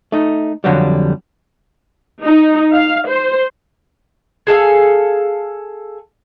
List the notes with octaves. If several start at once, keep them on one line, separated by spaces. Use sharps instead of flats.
A3 D#4
F2 D3 F#3 G3
D#4
F5
C5
G#4 A4 E5 F5